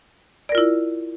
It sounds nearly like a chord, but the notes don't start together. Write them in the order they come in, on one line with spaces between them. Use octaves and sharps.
D5 A#4 F4 E4